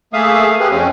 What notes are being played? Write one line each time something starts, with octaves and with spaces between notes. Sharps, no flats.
A3 A#3 G#4 E5 F5 D#6
G4 G#4 B4
F2 C4 C#4